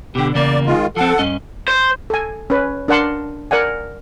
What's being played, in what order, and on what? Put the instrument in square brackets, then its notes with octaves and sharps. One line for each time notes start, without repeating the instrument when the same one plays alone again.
[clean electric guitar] B2 D3 [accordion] G4
[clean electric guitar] E2 C#3 A#3 [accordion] D5
[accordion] D#3 G#3 F4
[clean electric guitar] F3 C4 [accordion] A4 F#5
[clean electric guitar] G2 C#4 D#5
[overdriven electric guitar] C5
[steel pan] A4 G#5
C#4 B4
D4 A#4 D5 F#5 A5 C6
A#4 D5 F#5 G#5